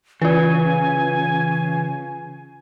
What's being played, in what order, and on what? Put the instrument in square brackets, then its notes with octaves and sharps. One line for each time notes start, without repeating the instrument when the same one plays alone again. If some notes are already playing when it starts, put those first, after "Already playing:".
[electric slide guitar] C#3 [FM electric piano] E3 [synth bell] F4 B4 [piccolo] G#5